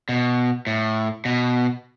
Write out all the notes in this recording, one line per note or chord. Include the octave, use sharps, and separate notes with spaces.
B2
A2
B2